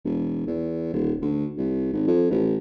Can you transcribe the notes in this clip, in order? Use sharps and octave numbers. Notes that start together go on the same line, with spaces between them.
E1
E2
D#1
D2
C2
G#1
F2
A1